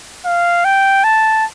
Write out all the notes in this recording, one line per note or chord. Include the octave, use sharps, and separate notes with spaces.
F5
G5
A5